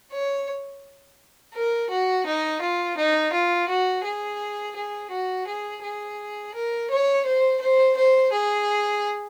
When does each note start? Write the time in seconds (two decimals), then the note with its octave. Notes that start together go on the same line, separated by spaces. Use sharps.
0.12 C#5
1.54 A#4
1.90 F#4
2.26 D#4
2.62 F4
2.97 D#4
3.33 F4
3.69 F#4
4.05 G#4
4.76 G#4
5.12 F#4
5.47 G#4
5.83 G#4
6.55 A#4
6.91 C#5
7.26 C5
7.62 C5
7.97 C5
8.33 G#4